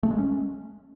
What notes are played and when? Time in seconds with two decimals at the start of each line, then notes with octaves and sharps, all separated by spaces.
0.03 A3
0.11 G#3
0.18 C#4